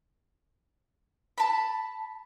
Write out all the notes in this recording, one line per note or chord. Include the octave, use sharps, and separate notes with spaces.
A5 B5